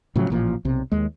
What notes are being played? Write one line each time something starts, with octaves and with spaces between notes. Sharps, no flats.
A2 C#3 F3 F#3
A1 A#2 F3
B1 C3
D#2 G#3